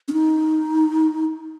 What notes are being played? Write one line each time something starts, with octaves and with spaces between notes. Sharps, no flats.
C#4
D#4